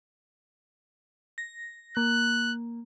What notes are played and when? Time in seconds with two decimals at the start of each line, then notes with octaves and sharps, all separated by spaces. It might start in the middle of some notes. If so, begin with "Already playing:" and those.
1.38 A#6
1.97 A#3 F#6